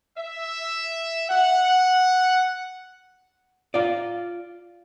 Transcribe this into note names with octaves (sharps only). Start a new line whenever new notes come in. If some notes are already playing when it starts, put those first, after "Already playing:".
E5
F#5
F4 D5